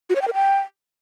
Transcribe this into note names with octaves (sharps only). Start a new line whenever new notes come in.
F#4
C#5
G5
A#4
G5